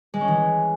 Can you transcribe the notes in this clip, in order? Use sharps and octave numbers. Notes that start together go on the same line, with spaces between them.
G#3
C#4
E3